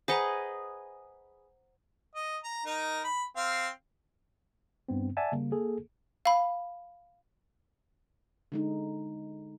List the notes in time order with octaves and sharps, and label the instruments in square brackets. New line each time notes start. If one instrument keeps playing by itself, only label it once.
[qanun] G#4 B4 D#5 [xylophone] C5 F#5 A#5
[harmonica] D#5
A#5
D#4 A#4
B5
C4 F5
[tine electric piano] G2 B3 C4
D5 E5 F#5 G#5 A5
C#3 G3 A#3
A#3 G#4 A4
[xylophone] F5 B5
[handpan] D3 G#3 D#4